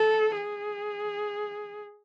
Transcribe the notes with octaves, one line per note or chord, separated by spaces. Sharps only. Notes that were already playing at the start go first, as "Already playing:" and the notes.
Already playing: A4
G#4